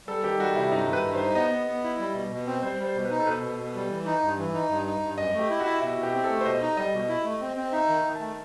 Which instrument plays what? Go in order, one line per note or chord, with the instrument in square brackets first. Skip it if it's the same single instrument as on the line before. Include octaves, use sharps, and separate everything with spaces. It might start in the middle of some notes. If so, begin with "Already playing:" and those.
[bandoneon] G3 [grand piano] A4
[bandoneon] D#3 [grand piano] G4
[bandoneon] G3 [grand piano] F#4
[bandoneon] C3 [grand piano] E4
[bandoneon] G2 [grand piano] D#4
[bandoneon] D#3 [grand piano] B4
[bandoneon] G2
[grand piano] C5
[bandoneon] D#4
[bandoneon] B3 [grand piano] D#5
[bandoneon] B3
B3
E4
G3
B2
B2
C4
[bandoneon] G3 [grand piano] C5
[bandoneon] G3
[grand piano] C5
[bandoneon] B2
[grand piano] B4
[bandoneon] D#4
[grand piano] A4
[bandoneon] B2 [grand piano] B4
[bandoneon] B2
B2
G3
E3
D#4
G2
E3
D#4
G2
D#4
G2
[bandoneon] F#2 [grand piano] D#5
[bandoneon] A3
[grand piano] G4
[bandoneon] E4
[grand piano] F#4
[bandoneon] E4
[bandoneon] B2 [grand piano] E4
[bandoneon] B2
[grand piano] G4
[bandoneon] C4
[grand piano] A4
[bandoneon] A3
[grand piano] C5
[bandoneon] B2 [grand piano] D#5
[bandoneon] D#4
[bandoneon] G3 [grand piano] D#5
[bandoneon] B2
E4
A3
C4
C4
[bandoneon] D#4 [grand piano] E5
[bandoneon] D#3
D#3
[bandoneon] A3 [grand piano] A5